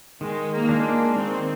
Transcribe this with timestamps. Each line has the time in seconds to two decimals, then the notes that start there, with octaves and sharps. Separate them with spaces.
0.21 D#3 G#3
0.53 A#3
0.69 G#3 D4 F4
0.84 A#3
1.16 D#3 C4